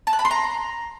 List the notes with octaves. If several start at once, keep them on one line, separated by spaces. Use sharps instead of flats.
A5
F#6
B5
C6
A#5